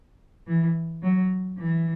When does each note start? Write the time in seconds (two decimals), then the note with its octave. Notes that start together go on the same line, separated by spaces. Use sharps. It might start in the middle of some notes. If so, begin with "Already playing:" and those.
0.47 E3
1.02 F#3
1.58 E3